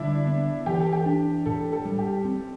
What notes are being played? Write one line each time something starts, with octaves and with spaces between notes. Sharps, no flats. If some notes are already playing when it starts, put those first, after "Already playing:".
Already playing: D3 G3 D4 E4
B3
E3 G4
A4
G4
D4
A2 A4
A4
G3
G4
C4